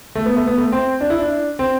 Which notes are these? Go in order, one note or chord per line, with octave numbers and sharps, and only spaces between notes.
A3
B3
A3
B3
A3
C4
D4
E4
D4
C4